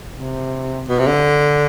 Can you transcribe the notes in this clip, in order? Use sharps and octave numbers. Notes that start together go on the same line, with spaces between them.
C3
B2
C3
D3